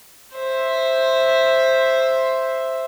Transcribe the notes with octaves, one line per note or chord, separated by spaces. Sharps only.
C5 E5